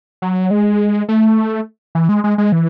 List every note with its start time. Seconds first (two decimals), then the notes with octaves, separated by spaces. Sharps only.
0.22 F#3
0.51 G#3
1.09 A3
1.95 E3
2.09 G#3
2.24 G#3
2.38 G#3
2.52 E3